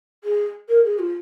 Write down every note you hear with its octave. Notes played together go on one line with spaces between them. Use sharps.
G#4
A#4
G#4
F4